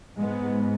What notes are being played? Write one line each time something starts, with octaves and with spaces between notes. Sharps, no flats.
G#2 G#3 B3